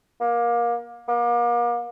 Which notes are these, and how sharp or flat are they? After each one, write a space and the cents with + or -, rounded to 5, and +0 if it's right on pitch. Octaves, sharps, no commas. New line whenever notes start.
A#3 +25
A#3 +40